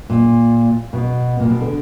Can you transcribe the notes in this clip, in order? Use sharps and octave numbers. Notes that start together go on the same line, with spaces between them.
A#2
B2
A#2
B2
D3